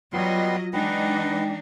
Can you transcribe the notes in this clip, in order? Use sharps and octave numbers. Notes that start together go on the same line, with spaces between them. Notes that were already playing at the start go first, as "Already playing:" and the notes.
F#3 G3 B3 F4 D#5 C6
E3 G#3 D4 D#4 B4 D#5 F#5 G5